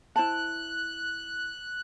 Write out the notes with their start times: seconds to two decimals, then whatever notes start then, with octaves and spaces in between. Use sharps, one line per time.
0.16 E4 C5 A5 F#6